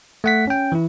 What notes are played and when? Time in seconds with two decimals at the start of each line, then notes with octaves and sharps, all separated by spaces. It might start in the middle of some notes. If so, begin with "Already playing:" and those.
0.24 A3 F#5 B6
0.47 C#4 G5
0.72 E3 E4